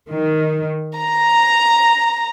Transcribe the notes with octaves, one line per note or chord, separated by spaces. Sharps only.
D#3
A#5